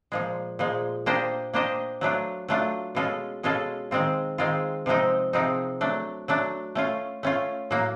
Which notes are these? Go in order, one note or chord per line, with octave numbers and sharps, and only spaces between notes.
A#2 F3 G#3
A#2 F3 G#3
A#3 D4 G4 C5 D#5
A#3 D4 G4 C5 D#5
F#3 A3 D4 F4
F#3 A3 D4 F4
B2 G#3 C#4 F4 A4
B2 G#3 C#4 F4 A4
D#3 G#3 C4 F4
D#3 G#3 C4 F4
C3 F3 G#3 C4 D#4
C3 F3 G#3 C4 D#4
F#3 A3 D4
F#3 A3 D4
A3 C#4 F4
A3 C#4 F4
A2 F#3 A#3